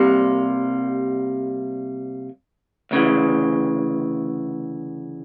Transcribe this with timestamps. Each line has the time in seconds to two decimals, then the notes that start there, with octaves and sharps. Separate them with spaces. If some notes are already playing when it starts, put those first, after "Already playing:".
Already playing: C2 C3 G3 A#3
2.91 D2 C#3 E3